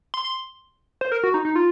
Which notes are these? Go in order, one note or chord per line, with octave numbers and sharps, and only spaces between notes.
C6
C6
C5
A#4
F#4
D#4
D#4
F4